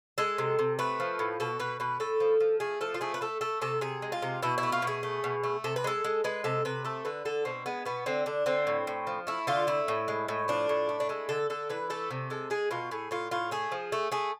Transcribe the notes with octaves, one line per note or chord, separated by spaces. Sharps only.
G#3 A4
C3
C3
A3 B4
F3
A2
B2 A4
B2 B4
B2 B4
A2 A4
F3
F3
A3 G#4
F3 A4
F4
A3 G#4
B4
A3 A4
A3 A4
C3 A4
C3 G#4
G#3
F4
C3
B2 E4
E4
A3
F4
B2
G#4
A3
B2
A3
C3 A4
B4
G#3 A4
G#3
G#3 B4
C3 A4
C3 B4
A3 A4
D3 B4
D3 A4
B2 C4
G#3 B3
B2 B3
D3 C4
D3 D4
D3 C4
A2
A2
F3
A3 E4
D3 F4
A3 E4
A2
G#3
A2
F3 D4
A2
A3
D4
G#3 E4
D3 A4
D3 A4
E3 B4
A3 A4
C3
G#3 A4
G#3 G#4
B2 F4
A2 G#4
A2 F4
A2 F4
A3 G#4
F3
A3
A3 G#4